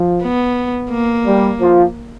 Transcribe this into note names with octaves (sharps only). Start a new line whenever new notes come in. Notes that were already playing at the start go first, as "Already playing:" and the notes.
Already playing: F3
B3
A#3
G3
F3